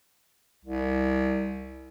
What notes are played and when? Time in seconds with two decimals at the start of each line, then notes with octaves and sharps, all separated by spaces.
0.65 C2